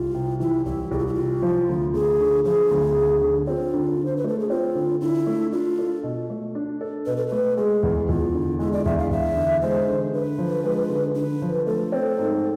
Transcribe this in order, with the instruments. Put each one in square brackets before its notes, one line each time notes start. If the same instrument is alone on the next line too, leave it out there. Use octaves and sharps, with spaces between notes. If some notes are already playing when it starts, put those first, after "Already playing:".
Already playing: [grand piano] C2 [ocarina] F4
[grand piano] C3
[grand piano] E3 [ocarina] E4
[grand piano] C2 [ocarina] E4
[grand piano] C2 [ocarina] G#4
[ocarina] F4
E4
[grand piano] C3 [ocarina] F4
[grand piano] F3
D2
[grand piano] D2 [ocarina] G#4
[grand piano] D3
[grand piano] F3 [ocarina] G#4
[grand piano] D2
D2
D3
[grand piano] C4 [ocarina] F4
[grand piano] D3
D3
[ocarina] C5
B4
[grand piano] A3 [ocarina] A4
[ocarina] G#4
[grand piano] C4 [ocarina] F4
[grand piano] D3
[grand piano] D3 [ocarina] E4
[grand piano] A3
[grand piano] D4 [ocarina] F4
[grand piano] A4
B2
A3
D4
A4
[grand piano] B2 [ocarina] B4
[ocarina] A4
[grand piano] A3 [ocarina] B4
[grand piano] G#3 [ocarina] G#4
[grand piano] E2
[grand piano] E2 [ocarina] F4
[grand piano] D3
[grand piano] G#3 [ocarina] E4
[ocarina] D5
[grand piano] E2 [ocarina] E5
[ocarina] F5
[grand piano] E2 [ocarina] E5
[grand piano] D3
[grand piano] G#3 [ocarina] C5
[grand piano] D3
[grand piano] D3 [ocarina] B4
[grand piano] F3
G#3
D3
[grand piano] D3 [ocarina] B4
[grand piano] F3
[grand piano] A3 [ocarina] A4
[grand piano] C4
G#2